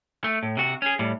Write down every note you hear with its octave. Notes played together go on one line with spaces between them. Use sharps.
A3
A2
C3 F#4
C#4 G#4
A2 G3